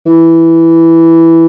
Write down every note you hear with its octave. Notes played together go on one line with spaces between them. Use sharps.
E3